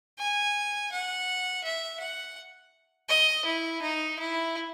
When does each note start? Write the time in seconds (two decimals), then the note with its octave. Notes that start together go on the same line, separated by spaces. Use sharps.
0.19 G#5
0.92 F#5
1.64 E5
2.00 F#5
3.09 D#5
3.45 E4
3.82 D#4
4.19 E4